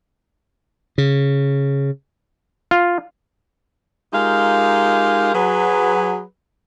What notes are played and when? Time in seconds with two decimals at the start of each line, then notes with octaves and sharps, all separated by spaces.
0.98 C#3
2.71 F4
4.13 G#3 D#4 F4 G4 A#4 F5
5.34 F#3 G#4 B4